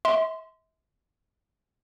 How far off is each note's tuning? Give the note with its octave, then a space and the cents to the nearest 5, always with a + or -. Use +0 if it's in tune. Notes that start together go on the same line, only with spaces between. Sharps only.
E5 -40 C6 -20